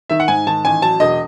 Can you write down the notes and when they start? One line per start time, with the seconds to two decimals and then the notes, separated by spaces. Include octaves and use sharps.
0.10 D#3 E5
0.20 F#5
0.28 G#2 G#5
0.47 D#3 A5
0.65 A1 G#5
0.82 F#3 A5
1.00 E1 D#5